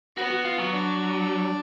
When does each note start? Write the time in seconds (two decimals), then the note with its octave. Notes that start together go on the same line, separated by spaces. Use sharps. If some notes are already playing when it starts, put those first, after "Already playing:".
0.17 B3 F#4
0.31 F#4
0.45 F4
0.59 F#3
0.72 D4